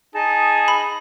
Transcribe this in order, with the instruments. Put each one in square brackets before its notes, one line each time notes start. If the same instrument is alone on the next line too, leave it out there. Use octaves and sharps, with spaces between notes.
[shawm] D#4 [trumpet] G#4 [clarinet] A5
[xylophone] B5